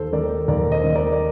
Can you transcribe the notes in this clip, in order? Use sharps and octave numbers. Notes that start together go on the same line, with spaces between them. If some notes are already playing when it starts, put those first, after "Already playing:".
Already playing: D#2 A4 C5
D#3 A#4 D5
D#2 A#4 D5
C5 D#5
D#3
A#4 D5
D5